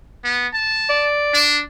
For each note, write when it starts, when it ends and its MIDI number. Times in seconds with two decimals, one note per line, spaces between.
0.24 0.47 59
0.54 1.06 81
0.90 1.47 74
1.34 1.62 62